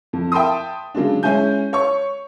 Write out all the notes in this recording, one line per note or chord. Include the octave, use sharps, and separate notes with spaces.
F2
E5 G5 A5 B5 C6 D#6
C#3 F#3 G#3 D4
G#3 C#4 E4 G#5 G6
C#5 C#6